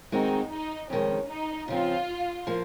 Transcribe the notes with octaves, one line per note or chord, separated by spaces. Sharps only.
D#3 G#3 C4 D#4 F#4
D#4
F2 D#3 G#3 C#4
D#4
C#3 F3 C4 F4
F3 A#3